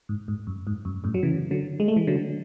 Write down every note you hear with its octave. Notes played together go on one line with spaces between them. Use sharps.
G#2
G#2
F#2
G#2
F#2
F#2 A2
F#3
C#3 E3
D3 F#3
G#3
A3
E3 G#3
D3 F#3